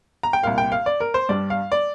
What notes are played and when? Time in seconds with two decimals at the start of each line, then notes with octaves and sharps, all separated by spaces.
0.23 A#5
0.33 G5
0.43 C2 A#2 A#3 F5
0.58 G5
0.72 F5
0.86 D5
1.00 A#4
1.14 C5
1.29 G2 G3 D4 D5
1.50 F5
1.72 D5